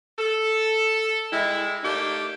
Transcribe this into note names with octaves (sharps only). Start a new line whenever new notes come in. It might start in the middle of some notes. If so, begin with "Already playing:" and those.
A4
G3 G#3 E4
A3 A#3 D4 D#4 G4